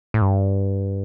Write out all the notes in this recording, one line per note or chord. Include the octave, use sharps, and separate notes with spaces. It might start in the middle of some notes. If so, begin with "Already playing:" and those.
A2
G2